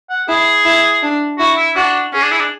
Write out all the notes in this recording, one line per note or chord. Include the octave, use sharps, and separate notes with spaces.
F#5
E4 G#4
E4
D4
E4 F#4
E4
D4 F#4
C#4 G#4
D4
E4
D4